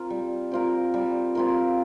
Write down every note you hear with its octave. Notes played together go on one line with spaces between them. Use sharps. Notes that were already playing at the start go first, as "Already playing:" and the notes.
Already playing: C4 F4 A#4
G3
C4 F4 A#4
G3
C4 F4 A#4